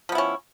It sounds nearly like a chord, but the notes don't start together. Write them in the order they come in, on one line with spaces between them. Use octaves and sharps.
F3 B3 E4 C#4